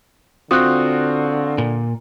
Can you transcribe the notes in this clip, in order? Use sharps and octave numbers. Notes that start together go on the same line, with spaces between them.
D3 C4 F4 F#4 D#6 F#6
A#2